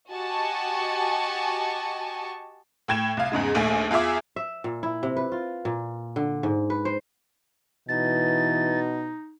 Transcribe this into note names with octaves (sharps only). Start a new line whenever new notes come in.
F#4 G4 D#5 G#5 A5 C#6
A2 G5 G#6 E7
C2 F5
E2 G#2 C#3 G#3
A#1 D#2 A3 G#5
E2 F4 G#4 E5 D6
E5
A#2
E4
C3
B4
F4
A#2
D3
G#2
B4
C5
B2 E3 D#4 A6